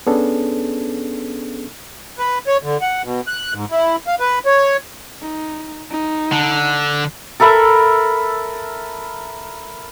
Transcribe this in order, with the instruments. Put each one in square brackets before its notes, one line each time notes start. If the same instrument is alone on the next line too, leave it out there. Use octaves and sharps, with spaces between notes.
[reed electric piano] B3 C#4 D4 G#4 A4
[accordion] B4
C#5
D3
F#5
B2
F#6
G#2
E4
F5
B4
C#5
[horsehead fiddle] D#4
D#4
[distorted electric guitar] D3
[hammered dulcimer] A4 A#4 E5 B5